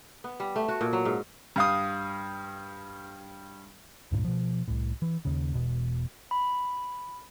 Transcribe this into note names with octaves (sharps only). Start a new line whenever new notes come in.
B3
G3
A3
F#4
A#2
F#3
G#2
G2 F5 D#6
C#2 G2 A#2
B2 F3
C2 A2
E3
D#2 C#3
E1 B2
B5